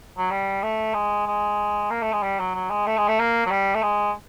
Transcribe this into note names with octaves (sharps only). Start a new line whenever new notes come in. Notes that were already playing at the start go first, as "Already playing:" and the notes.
F#3
G3
A3
G#3
G#3
A#3
A3
G#3
G3
F#3
F#3
G#3
A3
G#3
A3
A#3
F#3
G3
A3
G#3